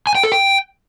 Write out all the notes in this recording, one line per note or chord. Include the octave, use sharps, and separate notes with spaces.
G#5
G5
A4
G5